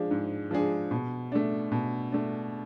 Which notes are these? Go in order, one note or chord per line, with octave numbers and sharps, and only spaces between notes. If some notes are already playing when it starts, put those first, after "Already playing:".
Already playing: F3 G#3 D4 G#4
G#2
F3 G#3 D4 G#4
B2
A3 D4
B2
A3 D4